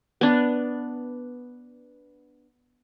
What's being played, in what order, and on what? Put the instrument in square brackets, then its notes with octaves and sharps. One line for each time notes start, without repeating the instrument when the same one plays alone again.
[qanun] B3 D4